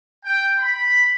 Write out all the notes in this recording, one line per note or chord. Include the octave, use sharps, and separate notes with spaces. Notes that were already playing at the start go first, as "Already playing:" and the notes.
G5
B5